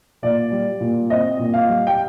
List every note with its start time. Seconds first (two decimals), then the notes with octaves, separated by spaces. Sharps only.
0.22 A#2 D5
0.52 G3
0.80 A#2
1.10 C4 D#5
1.39 A#2
1.54 F5
1.69 G3
1.87 G5